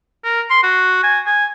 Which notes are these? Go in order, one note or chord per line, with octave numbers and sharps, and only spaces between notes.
A#4
C6
F#4
G#5
G#5